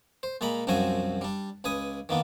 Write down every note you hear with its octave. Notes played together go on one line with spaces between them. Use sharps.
C5
A#2 G#3 A#3 A#5 B5
C2 F#2 F3 C4 F#4 G#5
G3 D4
C#2 B4 G#5 D#6
D#3 A#3 B3 D4